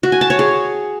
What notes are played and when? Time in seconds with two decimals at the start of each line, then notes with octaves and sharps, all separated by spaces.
0.03 F#4
0.12 G#5
0.21 A5
0.30 C#5
0.39 G#4